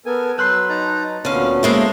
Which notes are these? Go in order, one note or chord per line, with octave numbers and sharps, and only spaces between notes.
B3 A4 A#4 G#5
F#3 B4 C6 E6 F#6 G6
D#4 A5 A#5
D2 A#2 D3 B3 C#4 F5
G#3 A#3 E4 A4 C5